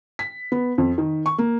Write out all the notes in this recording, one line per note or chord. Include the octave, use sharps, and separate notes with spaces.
B6
B3
F2
D#3
C#6
A#3